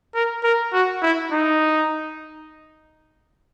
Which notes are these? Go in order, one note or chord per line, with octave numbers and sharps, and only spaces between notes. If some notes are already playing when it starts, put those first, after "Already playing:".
A#4
A#4
F#4
E4
D#4